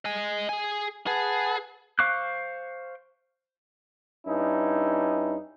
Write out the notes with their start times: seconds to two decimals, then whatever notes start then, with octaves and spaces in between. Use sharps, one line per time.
0.05 D#5 G#5
0.49 G#4 G#5
1.07 G#4 B4 F#5 A5
1.99 C5 F5 C#6 D6 F#6
4.26 G2 C#4 D#4 E4